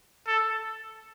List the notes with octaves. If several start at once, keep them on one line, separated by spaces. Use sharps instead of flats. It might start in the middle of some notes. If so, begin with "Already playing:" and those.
A4